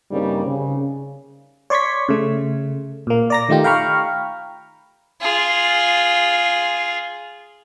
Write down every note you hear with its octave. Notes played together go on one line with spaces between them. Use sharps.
G2 C#3 G3 A#3 C4 D#4
C#3
C#5 D5 C6 C#6 G#6 B6
C#3 A3
A#2 A#3
D5 A#5 A#6
D#3 A3 D#4 F4 G4
F5 G5 A#5 B5 C#6 F6
F4 G#4